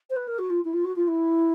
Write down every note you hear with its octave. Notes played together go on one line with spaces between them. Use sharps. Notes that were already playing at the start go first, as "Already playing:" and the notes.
C5
B4
A#4
F#4
F4
E4
F4
F#4
F4
E4